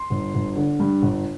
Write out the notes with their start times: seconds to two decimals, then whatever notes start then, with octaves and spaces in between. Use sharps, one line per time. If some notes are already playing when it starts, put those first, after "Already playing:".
Already playing: C6
0.10 G1
0.34 G1
0.56 D3
0.80 G2
1.02 G1